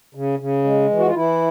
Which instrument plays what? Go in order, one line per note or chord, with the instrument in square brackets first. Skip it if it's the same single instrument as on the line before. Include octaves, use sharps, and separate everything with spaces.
[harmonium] C#3
C#3
G#3
E3
F#4
F4
E3 E4